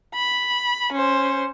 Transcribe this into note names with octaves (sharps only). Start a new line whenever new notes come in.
B5
C#4 C5